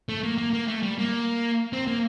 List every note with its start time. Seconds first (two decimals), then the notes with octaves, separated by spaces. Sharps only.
0.09 A3
0.23 A#3
0.38 A#3
0.53 A#3
0.68 A3
0.82 G3
0.98 A#3
1.73 C4
1.87 A#3